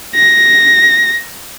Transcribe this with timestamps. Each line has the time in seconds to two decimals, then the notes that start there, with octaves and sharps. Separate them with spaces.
0.15 A#6